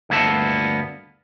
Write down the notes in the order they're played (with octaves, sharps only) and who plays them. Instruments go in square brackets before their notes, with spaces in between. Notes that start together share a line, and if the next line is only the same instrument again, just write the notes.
[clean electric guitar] D2 G2 A#3 B3 A4 A5